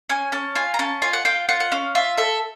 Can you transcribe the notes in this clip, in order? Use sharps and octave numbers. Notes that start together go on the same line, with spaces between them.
C#4 G#5
C#4 A5
F4 G#5
A#5
C#4 A5
F4 G#5
F#5
F4 G5
F4 F#5
F#5
C#4 F5
F4 E5
A4 E5